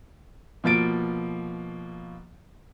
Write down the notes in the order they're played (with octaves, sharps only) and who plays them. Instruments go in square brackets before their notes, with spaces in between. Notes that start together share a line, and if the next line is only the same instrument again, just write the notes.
[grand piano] B2 F3 A#3 A6 D7